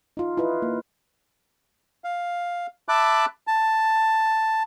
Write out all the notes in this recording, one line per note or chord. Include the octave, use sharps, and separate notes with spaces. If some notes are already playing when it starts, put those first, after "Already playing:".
D#4 F4
E4 F4 B4 D#5
A#3
F5
E5 A5 B5 D6 F#6
A5